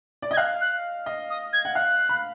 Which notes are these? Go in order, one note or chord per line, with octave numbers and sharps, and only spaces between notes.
D5
D#5 G#6
F5 F#6
F#6
D#5
D#6
G#6
F#5
F5 F#6
B5